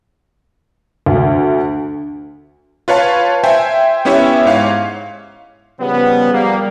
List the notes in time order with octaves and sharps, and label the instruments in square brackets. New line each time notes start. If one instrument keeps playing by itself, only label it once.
[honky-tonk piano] D2
[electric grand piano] F4 B4 C#5 F5 A5
C5 E5 G5 G#5
B3 C#4 E4 G4 C#5 E5
G#2 C#5 F5
[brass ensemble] C#3 F3 G3 B3
G3 A#3